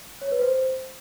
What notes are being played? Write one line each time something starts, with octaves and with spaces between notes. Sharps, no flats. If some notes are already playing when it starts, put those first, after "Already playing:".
C#5
B4
C5